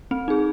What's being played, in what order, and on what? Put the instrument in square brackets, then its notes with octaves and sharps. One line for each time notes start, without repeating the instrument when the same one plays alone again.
[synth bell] C4
D#4 G#4